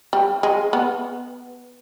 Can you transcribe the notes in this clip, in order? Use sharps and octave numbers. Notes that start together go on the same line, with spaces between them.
G3
G#3
B3